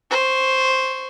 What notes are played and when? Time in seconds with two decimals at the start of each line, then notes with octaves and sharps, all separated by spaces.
0.10 C5 C#6